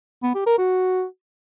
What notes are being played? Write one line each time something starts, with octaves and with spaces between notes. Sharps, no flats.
B3
G4
A#4
F#4